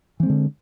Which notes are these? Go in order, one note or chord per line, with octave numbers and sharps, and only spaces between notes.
D3 E3 G#3 C4